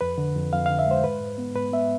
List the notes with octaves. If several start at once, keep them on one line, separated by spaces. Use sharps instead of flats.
F2 B4
D3
F2
F2 F5
D3 F5
E5
G#3 C5
G#2 B4
G#2
B3
G#2 B4
B3 E5